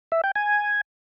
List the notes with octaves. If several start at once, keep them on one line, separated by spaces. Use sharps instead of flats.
E5
G5
G#5